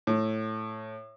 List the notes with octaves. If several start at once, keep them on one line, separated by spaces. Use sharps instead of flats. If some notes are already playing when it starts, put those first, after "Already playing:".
A2